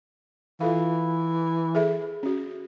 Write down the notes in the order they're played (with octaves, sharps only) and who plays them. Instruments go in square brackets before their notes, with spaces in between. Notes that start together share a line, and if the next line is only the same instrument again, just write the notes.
[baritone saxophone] E3 [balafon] F4 A4 F5
[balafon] G#4 A4 E5
C#4 F#4